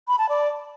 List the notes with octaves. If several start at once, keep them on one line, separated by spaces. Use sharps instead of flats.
B5
A5
D5